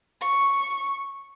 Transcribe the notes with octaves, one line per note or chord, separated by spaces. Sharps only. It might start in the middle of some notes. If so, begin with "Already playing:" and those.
C#6